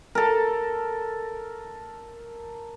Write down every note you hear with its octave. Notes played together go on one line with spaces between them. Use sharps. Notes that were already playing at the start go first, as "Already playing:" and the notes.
A4 A#4